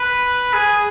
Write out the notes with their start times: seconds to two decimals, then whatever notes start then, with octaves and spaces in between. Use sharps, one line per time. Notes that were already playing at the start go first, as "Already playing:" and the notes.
Already playing: B4
0.53 G#4